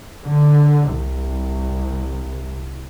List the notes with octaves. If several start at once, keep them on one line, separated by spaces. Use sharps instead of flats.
D3
C2